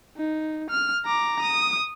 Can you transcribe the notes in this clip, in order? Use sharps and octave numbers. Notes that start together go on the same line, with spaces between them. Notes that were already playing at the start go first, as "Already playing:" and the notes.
D#4
F6
A#5 D6
D#6